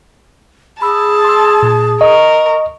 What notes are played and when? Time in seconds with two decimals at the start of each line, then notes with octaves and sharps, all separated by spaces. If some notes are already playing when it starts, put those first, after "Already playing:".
0.82 G#4 A5 B5 E6
1.24 C6 E6
1.62 A#2
2.01 A#4 D#5 C#6